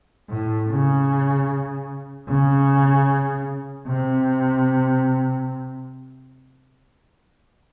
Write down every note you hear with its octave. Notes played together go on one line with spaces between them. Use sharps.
A2
C#3
C#3
C3